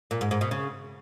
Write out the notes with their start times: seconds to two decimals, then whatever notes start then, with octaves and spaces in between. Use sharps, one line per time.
0.11 A#2
0.21 G#2
0.31 G#2
0.41 B2
0.51 C#3